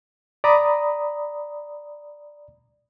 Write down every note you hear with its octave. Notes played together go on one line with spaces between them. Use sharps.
D5 A#5 B5 D#6